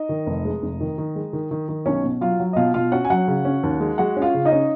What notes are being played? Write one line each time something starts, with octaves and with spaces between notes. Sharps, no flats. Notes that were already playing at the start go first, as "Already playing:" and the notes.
Already playing: D#4 D#5
D#3
F1
G#3
F1
D#3
D#3
G#3
D#3
D#3
D#3
B1 C#4 C#5
B2
F#3 F4 F5
F#3
D#5
B2 F4 F5
B2 F4 F5
C#4 F#4 F#5
G#5
F#3 F#4 F#5
C#3
C#4
D#2
G#3
G#3 F#4 F#5
C#4
F4 F5
C#3
D#4 D#5
C#4